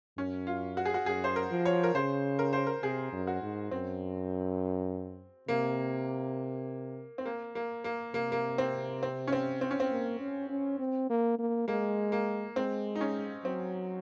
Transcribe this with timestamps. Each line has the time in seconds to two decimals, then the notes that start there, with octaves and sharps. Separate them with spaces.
0.17 F#2 C#4
0.47 F4
0.77 F#4
0.85 G#4
0.94 F#4
1.06 F#2 G#4
1.24 C5
1.36 A#4
1.51 F3
1.65 C#5
1.83 A#4
1.95 C#3 C5
2.39 A#4
2.53 C5
2.67 A#4
2.83 C3 G#4
3.13 F#2
3.27 F#4
3.42 G#2
3.71 F#2 C4
5.48 C3 A#3
7.18 C4
7.26 A#3
7.55 A#3
7.84 A#3
8.14 C3 A#3
8.32 A#3
8.58 C4
9.03 C4
9.27 C#4
9.32 C4
9.61 C4
9.71 C#4
9.80 C4
9.91 A#3
10.20 C#4
10.49 C#4
10.79 C4
11.10 A#3
11.39 A#3
11.68 G#3 A#3
12.12 A#3
12.56 G#3 C4
12.95 D#4
13.01 C#4
13.45 F#3 C4